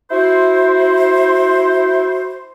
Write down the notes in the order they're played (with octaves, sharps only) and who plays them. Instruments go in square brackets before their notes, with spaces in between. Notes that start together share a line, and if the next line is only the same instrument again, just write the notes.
[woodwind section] E4 F#4 C5